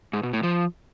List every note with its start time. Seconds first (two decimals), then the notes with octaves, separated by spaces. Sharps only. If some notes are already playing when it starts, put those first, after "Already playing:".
0.13 G#2
0.23 B2
0.33 A2
0.43 F3